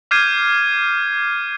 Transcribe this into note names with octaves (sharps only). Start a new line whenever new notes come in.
D6 F6 G6 G#6 C7 D#7